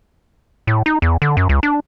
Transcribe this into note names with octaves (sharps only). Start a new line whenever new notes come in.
A2
D#4
E2
D3
F#2
C#2
D4